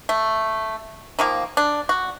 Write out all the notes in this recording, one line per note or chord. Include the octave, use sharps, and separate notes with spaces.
A3
D#3 F3 A#3
D4
F#4